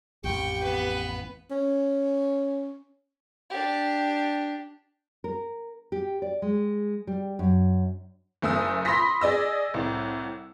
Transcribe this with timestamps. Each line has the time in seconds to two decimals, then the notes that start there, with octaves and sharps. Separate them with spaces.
0.24 A1 F2 G4 G5 C#6
0.63 B3 B4
1.51 C#4
3.50 D4 G4
5.24 A#4
5.92 G4
6.22 D5
6.42 G#3
7.07 G3
7.39 F#2
8.42 F#1 A3 D#6 E6
8.85 B5 C6 D#6 A#6 B6
9.21 G#4 D5 D#5 E6
9.74 C2 A2